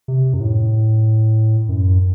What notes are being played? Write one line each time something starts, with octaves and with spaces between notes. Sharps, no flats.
C3
F#2
A2
F#2